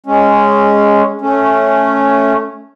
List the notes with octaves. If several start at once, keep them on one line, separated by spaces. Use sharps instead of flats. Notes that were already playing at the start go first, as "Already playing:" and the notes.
G#3 C#4
A3 C#4